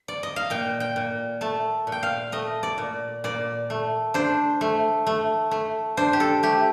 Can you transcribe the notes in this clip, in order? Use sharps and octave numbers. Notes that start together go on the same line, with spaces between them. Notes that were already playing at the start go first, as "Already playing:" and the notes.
Already playing: C5
D5
D#5
F5
A#2 G5
G5
A#2
A3 A5
A#2
G5
F5
A3 D#5
D5
A#2
A#2 D5
A3
D4 C5
A3
A3
A3
D4 C5
G4
A4
A3 G4